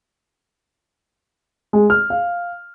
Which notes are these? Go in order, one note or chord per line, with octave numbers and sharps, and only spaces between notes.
G#3
F6
F5